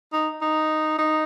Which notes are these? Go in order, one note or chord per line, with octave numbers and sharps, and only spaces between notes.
D#4
D#4
D#4